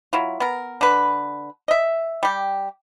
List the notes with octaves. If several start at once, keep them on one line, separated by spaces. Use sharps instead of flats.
F#3 E4 F4
B3 A#4
D3 B4
D#5 E5
G3 G4